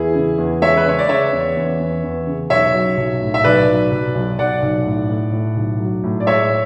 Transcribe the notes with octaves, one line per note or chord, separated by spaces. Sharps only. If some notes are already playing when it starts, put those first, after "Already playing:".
Already playing: E2 E4 G#4
C#3
E2
G#3 C#5 E5
B4
C#3 C#5
D5
C#3 C#5 E5
E2
E2
E2
E2
C#3
B1 C#5 E5
F#3
B1
A2
E5
B1 B4 D5
F#3
B1
B1
B1 D5 F#5
B1
A2
A2
A2
B1
F#3
A2
D5
G#3 C#5 E5